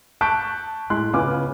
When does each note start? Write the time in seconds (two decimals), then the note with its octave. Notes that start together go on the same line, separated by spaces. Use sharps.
0.21 A5 C#6 F#6 G6 B6 D7
0.90 A2 G#3 C6 F#6
1.13 C#2 C#3 B3 G#5 D6 F6